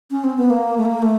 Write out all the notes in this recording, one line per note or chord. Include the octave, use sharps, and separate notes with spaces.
C#4
C4
B3
A#3
A3
A#3
A3